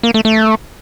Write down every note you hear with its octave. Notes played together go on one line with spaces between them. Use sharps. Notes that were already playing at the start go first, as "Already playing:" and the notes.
A#3
A3
A3